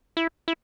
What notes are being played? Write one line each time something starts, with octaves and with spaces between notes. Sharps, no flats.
E4
E4